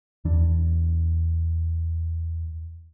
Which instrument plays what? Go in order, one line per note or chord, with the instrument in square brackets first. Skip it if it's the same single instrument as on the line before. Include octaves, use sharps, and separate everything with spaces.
[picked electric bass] E2 E3 D4